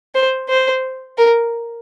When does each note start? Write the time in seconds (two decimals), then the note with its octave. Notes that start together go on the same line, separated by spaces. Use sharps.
0.15 C5
0.49 C5
1.18 A#4